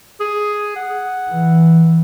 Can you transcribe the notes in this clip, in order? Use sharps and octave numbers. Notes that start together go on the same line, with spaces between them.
G#4
F#5
E3